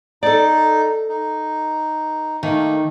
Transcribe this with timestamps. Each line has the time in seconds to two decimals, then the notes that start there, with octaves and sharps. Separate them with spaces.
0.23 D#4 A4 D5
1.09 D#4
2.43 D#3 A3 A#3